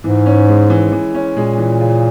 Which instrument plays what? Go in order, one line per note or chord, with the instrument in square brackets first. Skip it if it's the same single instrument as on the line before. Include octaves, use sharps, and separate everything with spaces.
[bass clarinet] G#2 [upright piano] E3
[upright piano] C#4
G#3
E3
E3
C#4
[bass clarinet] A#2 [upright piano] G#3
[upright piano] E3
C#3